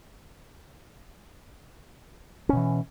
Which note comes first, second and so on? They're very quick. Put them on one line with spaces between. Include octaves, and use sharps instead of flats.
C#4 B2 E3